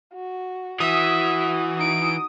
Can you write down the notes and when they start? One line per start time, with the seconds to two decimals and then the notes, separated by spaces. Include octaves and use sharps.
0.14 F#4
0.80 E3 F#4 E5 D#6
1.77 D#4 D7